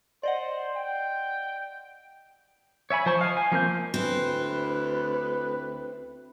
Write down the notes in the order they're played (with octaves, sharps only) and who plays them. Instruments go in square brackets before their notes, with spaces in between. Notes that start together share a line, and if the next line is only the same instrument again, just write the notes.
[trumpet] C5 [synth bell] D5 D#5 F#5
[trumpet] G5
[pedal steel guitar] C#5 E5 G#5 B5
F3 C5 A5 C#6
D#5 F5
G#5
F3 A#3 C4 G6
[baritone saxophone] D2 [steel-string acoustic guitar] C4 E4 [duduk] B4